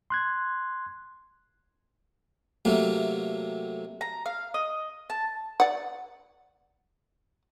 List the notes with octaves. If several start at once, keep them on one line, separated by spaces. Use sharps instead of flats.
C6 F#6 G#6
C3 F#3 A3 A#3
A#5
F5
D#5
A5
D5 F#5